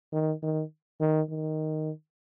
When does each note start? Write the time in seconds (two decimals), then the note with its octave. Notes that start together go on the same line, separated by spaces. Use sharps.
0.12 D#3
0.42 D#3
1.00 D#3
1.29 D#3